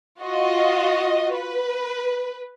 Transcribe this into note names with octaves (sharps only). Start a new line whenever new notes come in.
F4 F#4 D#5
B4